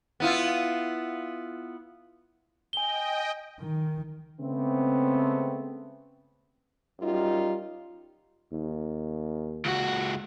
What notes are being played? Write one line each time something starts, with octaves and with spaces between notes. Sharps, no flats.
B3 E4 F4
D#5 G5 G#5 G7
D#3
C#3 G#3 A3 B3 C4
F#2 G3 D#4 F4
D#2
C#2 F#4